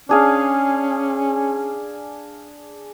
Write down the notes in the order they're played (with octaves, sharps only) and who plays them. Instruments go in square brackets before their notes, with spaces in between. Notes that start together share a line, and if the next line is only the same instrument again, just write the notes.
[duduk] C#4 [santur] D4 G#4 F5